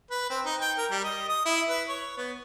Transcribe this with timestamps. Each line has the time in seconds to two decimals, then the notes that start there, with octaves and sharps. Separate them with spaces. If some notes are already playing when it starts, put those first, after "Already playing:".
0.11 B4
0.30 C4
0.45 D#4
0.61 G5
0.78 A#4
0.91 G3
1.04 D#5
1.29 D#6
1.46 E4
1.69 B4
1.89 C#5
2.17 B3